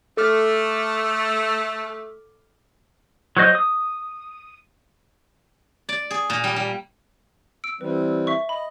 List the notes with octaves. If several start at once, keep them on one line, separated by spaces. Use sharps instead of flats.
A3 A4 D6 F6
F#3 F#4 C5 D#5 G6
D#6
D5
G#4
A#2
G3
G3
E6 D7
E3 G3 C4 B4
E5 C#6
D#5 B5